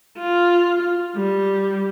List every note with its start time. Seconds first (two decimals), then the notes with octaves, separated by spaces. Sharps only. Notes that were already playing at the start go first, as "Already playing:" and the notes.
0.18 F4
1.16 G3